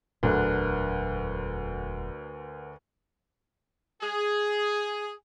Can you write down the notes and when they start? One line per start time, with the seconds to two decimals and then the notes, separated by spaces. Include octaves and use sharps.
0.23 E1 D2 A#2 D3 F#3 A#4 B4 F#6
4.02 G#4